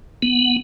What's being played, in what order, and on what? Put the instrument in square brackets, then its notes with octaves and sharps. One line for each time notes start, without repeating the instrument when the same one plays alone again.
[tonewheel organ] B3